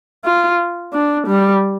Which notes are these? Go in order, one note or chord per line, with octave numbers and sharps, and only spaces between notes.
F4
D4
G3